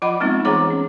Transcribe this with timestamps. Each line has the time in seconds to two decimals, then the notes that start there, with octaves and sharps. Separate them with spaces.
0.02 F3 F4 D#5 F#5 B5
0.20 G3 G#3 B3 C4 D#4
0.45 E3 G#4 C#5 F#5 A#5 D6
0.70 C#4